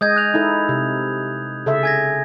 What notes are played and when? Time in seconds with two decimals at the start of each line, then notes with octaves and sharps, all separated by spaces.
0.01 G#3 D#5 D#6 G6 G#6
0.16 F#6 F7
0.34 D#4 E4 A4
0.69 C3
1.66 C#3 A4 E5
1.83 G#5 G#6 A#6